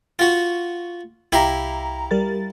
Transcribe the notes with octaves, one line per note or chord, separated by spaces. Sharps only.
F4 F#4
C2 E4 G4 F5 A#5
G3 A#4 A6